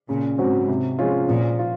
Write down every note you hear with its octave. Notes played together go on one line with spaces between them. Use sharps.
A#2 C#3
G#2 F#3 C4 F#4
C3
F3 G#3 C#4 F4
A#2 F3
F4